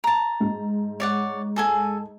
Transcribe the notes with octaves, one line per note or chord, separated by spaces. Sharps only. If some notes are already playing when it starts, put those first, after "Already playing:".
A5 A#5
G#2
C#5 D5 F#5
G#4 A4 G#5